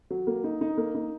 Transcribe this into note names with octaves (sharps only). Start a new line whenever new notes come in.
F#3
A#3
D#4
D#4
A#3
D#4